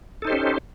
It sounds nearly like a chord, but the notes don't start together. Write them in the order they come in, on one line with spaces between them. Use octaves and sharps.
A4 D#4 C5 G4 C#4